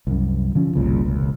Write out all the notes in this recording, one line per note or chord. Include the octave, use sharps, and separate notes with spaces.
C2 F#2
D3 F3 C#4
F#1 C2 A#2 C#3
E1 C#2